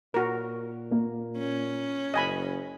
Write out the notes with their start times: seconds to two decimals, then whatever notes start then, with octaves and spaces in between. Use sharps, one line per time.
0.14 A#2 F#4 A#4
0.91 A#3
1.38 C#4
2.14 F#1 D#5 G#5 B5